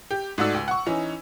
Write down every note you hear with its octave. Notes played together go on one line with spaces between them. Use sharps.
G4
G#2 A3 F#4 D5 E6
C#2
F#5 C#6
E3 C#4 D#4